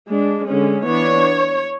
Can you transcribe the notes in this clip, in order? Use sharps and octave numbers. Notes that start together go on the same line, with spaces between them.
G#3 D4
D3 G#3 C#4
E3 B3 D4 C#5